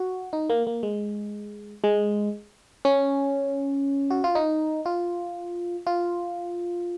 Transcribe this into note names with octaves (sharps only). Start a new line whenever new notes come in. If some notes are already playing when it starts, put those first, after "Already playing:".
Already playing: F#4
D#4
A#3
A#3
G#3
G#3
C#4
F#4
F4
D#4
F4
F4